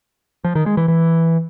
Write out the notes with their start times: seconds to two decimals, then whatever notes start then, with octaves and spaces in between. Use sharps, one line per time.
0.44 F3
0.55 D#3
0.66 G#3
0.77 E3
0.88 E3